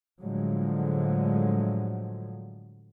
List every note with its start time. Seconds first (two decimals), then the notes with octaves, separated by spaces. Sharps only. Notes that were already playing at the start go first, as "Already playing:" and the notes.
0.20 A2 D3 F3 F#3 G#3